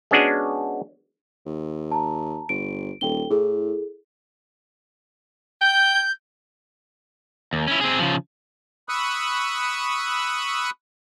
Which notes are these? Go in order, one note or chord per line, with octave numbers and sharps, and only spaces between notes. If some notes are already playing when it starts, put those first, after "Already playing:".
G#3 B3 C#4 D4 F#4 G#4
D#2
A5 A#5
G1 D7
D#1 A4 G5 G7
A2 E4 G#4 A4
G5 G6
D#2
C#4 E4
C4 G#4
C#3 F3
B5 C#6 D#6 E6 F#6